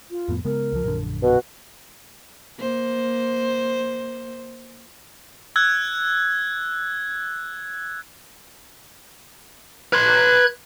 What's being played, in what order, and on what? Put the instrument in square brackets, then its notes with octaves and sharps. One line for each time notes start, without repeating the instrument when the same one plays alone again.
[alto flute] F4
[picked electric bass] F2 A2 B3
[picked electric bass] C#3 G#3 B3 [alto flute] A#4
[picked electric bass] C#2 F3
A#1 F#2 D3
[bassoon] B2 [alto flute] F#4
[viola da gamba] A#3 C5
[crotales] E6 F#6 G#6
[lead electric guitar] B4 C6 [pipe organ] F#6 G#6